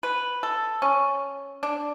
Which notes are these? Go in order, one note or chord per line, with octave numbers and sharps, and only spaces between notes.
B4
A4
C#4
D4